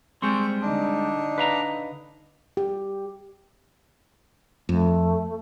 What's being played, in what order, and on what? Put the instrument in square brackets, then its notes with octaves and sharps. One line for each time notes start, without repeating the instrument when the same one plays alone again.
[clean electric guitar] G3 G#3 C4 [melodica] C5 C#6
[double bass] D3 D#4 [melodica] D4
[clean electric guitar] B4 F5 A#5
[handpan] G4
[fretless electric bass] F2 [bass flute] A3